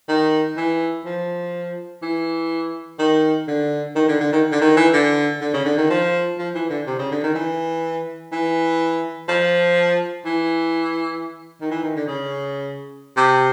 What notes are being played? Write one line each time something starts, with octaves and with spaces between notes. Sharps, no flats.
D#3
E3
F3
E3
D#3
D3
D#3
D3
D3
D#3
D3
D#3
E3
D3
D3
C#3
D3
D#3
F3
F3
E3
D3
C3
C#3
D3
D#3
E3
E3
F3
E3
D#3
E3
D#3
D3
C#3
C3